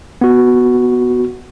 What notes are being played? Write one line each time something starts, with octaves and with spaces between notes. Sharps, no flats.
B3 F#4